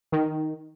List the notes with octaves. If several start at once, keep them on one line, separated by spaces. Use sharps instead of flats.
D#3